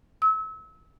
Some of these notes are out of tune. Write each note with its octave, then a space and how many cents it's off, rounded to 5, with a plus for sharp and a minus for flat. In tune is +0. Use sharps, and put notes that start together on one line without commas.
E6 -30